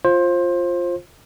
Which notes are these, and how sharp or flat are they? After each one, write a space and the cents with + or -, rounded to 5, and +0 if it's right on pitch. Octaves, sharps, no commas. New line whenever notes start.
F4 +0 C5 +20